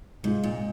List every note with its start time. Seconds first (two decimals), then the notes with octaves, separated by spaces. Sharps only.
0.24 G#2 C3 G#3 F4
0.44 A#2